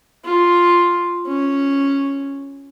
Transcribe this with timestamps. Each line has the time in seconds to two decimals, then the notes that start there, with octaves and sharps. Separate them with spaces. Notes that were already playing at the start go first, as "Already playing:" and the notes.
0.24 F4
1.27 C#4